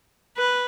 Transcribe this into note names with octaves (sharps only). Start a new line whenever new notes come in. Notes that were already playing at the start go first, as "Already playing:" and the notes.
B4